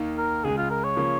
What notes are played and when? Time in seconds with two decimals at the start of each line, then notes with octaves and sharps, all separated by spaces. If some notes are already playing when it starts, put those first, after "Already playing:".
Already playing: D#2 D#3 A#3
0.17 A#4
0.44 C#2 C#3 G#3 G#4
0.57 F4
0.70 A#4
0.84 C#5
0.96 C#3 F3 A#3